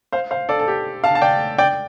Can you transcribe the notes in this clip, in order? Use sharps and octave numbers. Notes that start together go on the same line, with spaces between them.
C5 F5
C5 F5
A4 D5
A4
G4
F5 A5
A5
D5 G5
D5 G5